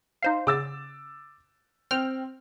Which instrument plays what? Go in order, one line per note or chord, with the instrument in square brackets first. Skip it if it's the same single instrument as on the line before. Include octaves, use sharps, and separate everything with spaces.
[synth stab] D#4 C5 F5
[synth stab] C#3 [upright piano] D6 E6 A6
[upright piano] C4 [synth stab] G5 F6